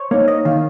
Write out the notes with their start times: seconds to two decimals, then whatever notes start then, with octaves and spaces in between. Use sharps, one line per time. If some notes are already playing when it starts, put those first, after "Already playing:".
Already playing: C5 C#5
0.11 A#3 D#4 C#5
0.28 D#5
0.45 D#3 F5